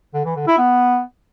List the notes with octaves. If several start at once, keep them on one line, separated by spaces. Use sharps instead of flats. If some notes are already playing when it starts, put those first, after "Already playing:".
D3
E3
D3
E4
B3